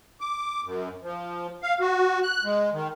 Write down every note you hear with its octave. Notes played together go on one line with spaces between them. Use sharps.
D6
F#2
F3
F5
F#4
F#6
G#3
D#3